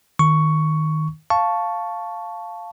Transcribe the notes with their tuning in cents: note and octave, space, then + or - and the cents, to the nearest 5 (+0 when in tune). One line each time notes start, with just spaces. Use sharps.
D#3 +0 C#6 +5
F5 +0 A5 +0 C#6 +0